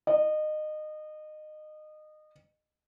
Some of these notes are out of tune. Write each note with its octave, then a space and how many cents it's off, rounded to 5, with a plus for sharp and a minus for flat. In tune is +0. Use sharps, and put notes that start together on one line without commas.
D#5 -25